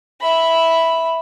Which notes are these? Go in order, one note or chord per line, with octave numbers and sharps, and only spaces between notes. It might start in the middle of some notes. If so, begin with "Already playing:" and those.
E5 B5